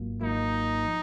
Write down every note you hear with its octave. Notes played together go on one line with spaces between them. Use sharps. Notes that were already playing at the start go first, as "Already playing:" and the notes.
Already playing: G#1 G#2 F#3 A#3 F4
G#1 G#2 F#3 A#3 D#4 F4
F3